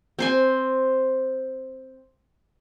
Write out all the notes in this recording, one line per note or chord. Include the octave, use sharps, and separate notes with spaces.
C4 C5 G#5